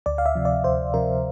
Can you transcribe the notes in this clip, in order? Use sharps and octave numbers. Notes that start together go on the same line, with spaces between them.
D2 D5
F5
E5
C3 F3
D5
D2 C5
C3 F3 A#4